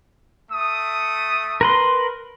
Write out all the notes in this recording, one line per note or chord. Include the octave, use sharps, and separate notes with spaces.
A3 D#6
A#4 B4 C6